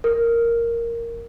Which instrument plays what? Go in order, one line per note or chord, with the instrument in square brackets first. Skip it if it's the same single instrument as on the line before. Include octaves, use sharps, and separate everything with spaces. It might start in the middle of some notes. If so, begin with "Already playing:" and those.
[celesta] A#4